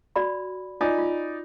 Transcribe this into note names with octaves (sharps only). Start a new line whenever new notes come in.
F#4 D5 B5
D#4 F4 D5 G#5
F4